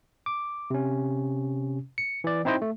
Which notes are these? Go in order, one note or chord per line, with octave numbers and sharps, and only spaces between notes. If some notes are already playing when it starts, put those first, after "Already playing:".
D6
C3 C#4
C#7
E3 D5
C4 D#4 E4 C5 D#5 G5
A3